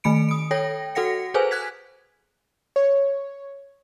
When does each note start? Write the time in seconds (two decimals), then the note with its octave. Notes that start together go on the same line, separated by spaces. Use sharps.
0.04 D#3 A3 B5 C#7 D7
0.29 D#6 D7
0.51 A4 C#5 G5 A#6
0.95 F#4 A4 F#5 A#6 C#7
1.34 G#4 A4 B4 C5 G#5
1.51 F#6 G#6 B6
2.76 C#5